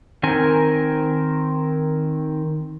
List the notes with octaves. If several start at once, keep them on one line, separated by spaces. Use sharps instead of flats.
D#3 C4 A#4 G#5